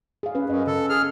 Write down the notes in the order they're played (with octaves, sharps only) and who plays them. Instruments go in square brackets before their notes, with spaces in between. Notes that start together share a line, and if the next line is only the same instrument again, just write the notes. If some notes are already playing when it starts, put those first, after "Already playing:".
[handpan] G#4 F5
C#4 B4
[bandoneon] F#2 [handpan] D#5
[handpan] C#3 [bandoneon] A4
[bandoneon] G#4 F6